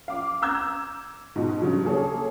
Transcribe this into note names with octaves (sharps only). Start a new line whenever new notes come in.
F5 D6
A#5 E6 G6 G#6
G#2 B2
G2 C#3 F#3
A#3 G#4 A4 C#5